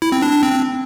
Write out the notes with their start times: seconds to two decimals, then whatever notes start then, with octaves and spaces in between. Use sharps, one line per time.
0.02 E4
0.12 C4
0.22 D4
0.33 D4
0.43 C4